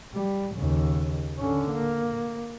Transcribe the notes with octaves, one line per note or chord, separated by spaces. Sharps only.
G3
D#2 C#3
D3 C#4
A#3